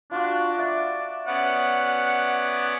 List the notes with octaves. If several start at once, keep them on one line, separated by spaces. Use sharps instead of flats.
D4 F4 F#4
D5 E5 B5
B3 C#4 D5 F#5